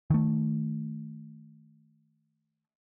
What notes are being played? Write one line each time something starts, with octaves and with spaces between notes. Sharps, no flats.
D#3 A3